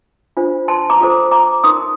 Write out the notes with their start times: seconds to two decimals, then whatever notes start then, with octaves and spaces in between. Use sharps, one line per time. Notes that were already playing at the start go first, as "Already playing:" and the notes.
0.37 D4 F4 C5
0.68 A5 C6
0.90 A#5 D6
1.00 F4 A4 C5
1.31 A#5 D6
1.64 D#4 A#4 C6 D#6